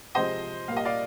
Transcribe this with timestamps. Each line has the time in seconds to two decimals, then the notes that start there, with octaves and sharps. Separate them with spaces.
0.15 C3 F3 G#3 C4 C5 D#5
0.68 A#2 G3 A#3 F5
0.76 D#5
0.85 D5 F5